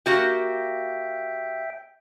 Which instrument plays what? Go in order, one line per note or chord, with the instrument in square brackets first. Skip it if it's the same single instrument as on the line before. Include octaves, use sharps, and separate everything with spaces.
[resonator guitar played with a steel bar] A#3 F#4 G4 [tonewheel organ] E5 G5